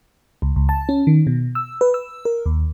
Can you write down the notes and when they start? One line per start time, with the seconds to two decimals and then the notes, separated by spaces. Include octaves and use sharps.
0.42 C#2
0.56 C#2
0.69 A5
0.89 C#4
1.07 D#3
1.27 B2
1.55 E6
1.81 B4
1.94 E6
2.25 A#4
2.46 D#2